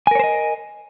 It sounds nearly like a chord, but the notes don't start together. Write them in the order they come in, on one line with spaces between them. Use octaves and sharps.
G#5 A#4 C#5 C5 D#5